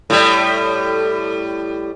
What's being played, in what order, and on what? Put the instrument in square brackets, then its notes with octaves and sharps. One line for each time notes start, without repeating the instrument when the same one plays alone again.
[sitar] A2 G3